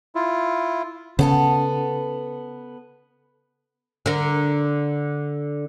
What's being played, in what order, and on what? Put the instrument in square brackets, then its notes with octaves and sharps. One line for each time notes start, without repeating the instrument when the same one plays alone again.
[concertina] E4 F4
[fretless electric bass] C#3 [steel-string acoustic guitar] B3 A4 A5
[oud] D3 A#4